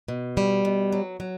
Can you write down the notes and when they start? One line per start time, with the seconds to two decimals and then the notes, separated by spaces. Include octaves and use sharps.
0.08 B2
0.37 G3
0.65 B2
0.92 F#3
1.20 F#3